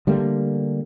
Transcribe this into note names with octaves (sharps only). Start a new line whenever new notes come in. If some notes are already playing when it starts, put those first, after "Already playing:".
D3 G3 A3 A#3